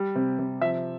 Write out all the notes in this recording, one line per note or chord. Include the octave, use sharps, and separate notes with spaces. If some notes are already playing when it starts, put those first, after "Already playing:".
Already playing: G3
C3
C3
F3 E5